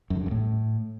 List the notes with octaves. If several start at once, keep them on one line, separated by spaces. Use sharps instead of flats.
F#2
D3
G2
F#2
A2